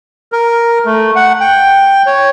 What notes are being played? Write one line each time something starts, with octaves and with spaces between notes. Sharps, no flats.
A#4
A3
F#5
G5
C#5